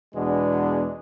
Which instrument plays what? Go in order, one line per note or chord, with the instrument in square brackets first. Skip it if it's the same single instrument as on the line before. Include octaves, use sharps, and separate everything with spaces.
[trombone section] E2 B2 G#3 D4